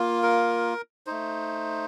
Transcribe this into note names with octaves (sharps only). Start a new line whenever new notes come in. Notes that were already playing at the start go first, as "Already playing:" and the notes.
Already playing: A#3 F4
A#4
A3 D#4 C5